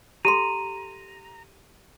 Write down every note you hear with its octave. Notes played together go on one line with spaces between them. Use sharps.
G4 A4 A#5 C6 D#7